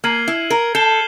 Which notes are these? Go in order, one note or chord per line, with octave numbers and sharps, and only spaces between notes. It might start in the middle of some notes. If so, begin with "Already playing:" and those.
A#3 F6 G#6 C7 D#7 F#7
E4
A#4
A4 G6 C7 E7 G7